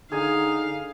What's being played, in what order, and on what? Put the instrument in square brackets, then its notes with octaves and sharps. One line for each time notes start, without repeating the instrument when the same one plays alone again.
[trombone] D3 [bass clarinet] D#4 [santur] G#4 G#5 [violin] F5